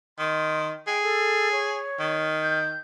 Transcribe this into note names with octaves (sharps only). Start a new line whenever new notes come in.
D#3 C6
G#4 G5
A4
C#5
D#3
G6